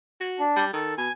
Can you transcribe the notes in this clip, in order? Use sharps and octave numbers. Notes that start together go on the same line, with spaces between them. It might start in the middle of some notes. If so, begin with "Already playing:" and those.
F#4
D4
G3
D#3 A4
B2 G#5